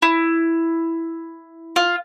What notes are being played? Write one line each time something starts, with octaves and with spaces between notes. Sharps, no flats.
E4
F4